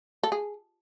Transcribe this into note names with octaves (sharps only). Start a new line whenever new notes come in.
A4
G#4